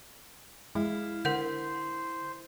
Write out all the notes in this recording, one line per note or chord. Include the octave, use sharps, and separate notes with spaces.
G#3 E4 F5
D3 A#4 C5 F#5 G6